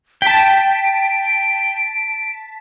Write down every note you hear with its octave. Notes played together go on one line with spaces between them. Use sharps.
G5 A5 B6 D7